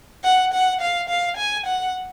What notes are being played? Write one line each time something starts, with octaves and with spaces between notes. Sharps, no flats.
F#5
F#5
F5
F5
G#5
F#5